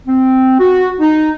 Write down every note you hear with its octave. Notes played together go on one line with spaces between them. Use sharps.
C4
F#4
D#4